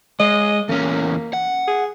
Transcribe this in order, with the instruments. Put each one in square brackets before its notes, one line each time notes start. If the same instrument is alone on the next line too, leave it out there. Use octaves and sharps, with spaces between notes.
[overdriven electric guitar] G#3 [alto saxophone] D#5
[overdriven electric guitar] E2 C#4 [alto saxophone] A#3
[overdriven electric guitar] F#5
[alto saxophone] G#4